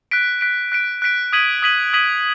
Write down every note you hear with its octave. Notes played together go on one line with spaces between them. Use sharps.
F#6 B6 D7
F#6 B6 D7
F#6 B6 D7
F#6 B6 D7
D#6 G#6 B6 D#7 F#7
D#6 G#6 B6 D#7 F#7
D#6 G#6 B6 D#7 F#7